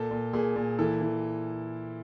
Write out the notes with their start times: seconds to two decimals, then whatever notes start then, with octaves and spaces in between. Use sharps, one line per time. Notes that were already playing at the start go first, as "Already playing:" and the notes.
Already playing: A#2 A4
0.11 A#2
0.33 A#2 G#4
0.56 A#2
0.79 E3 A4
1.01 E3